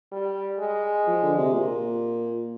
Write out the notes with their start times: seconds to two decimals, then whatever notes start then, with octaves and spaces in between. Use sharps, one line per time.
0.12 G3
0.59 G#3
1.07 F3
1.22 D3
1.38 C3
1.54 A#2